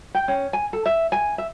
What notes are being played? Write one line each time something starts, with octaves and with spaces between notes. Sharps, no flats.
G5
C#4
G#5
A4
E5
G#5
E5